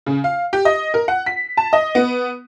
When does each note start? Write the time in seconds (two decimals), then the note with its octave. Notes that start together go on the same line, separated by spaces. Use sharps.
0.06 C#3
0.24 F5
0.53 G4
0.65 D#5
0.94 A#4
1.08 F#5
1.26 B6
1.57 A5
1.73 D#5
1.95 B3